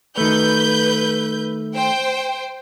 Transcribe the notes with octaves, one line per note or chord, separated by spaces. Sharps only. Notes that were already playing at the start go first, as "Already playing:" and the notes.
D#3 A3 B4 G6
C5 G5